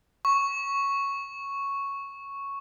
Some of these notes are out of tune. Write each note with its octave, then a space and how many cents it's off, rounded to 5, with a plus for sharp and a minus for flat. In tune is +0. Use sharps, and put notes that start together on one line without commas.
C#6 +0